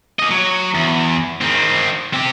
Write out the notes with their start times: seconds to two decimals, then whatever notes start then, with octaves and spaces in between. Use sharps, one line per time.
0.19 A#3 D#5
0.31 F#3
0.75 E2
1.41 D#3 C4
2.14 C4 G4